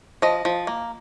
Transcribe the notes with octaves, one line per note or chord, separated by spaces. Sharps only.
F3 D#5
F3
A#3